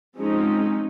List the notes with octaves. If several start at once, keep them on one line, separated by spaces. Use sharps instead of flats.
F3 G#3 C4 C#4 D#4